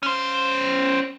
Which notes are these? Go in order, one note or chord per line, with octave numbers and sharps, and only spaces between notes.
C#4 C5